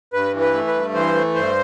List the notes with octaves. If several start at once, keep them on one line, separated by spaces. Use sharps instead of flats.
G2 B4
E3
B4
A3
B4
G2
E3 C5
A3
G2 C5